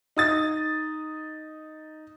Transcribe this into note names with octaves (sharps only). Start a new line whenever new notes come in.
D#4 D#6 A6